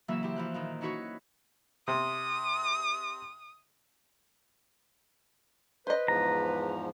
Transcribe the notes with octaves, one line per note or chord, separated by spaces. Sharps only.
C#3 E3 F#3 A#3 E5 E6
E4 G4 C5
E3 F3 F#6
A#2 D#3 E3
C#4 D#4 E4 F#4 B4 C#5
C3 D#6
B4 C5 D#5
E2 G#2 F3 A#5